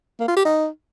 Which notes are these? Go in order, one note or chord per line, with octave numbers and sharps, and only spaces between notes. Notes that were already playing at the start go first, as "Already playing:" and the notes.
A#3
F4
G4
D#4